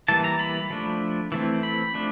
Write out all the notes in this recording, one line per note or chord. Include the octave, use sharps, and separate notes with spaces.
E3 G3 A#3 A5
A#5
B5
F3 A3 D4
E3 A3 C4 E4
B5
F3 A3 D4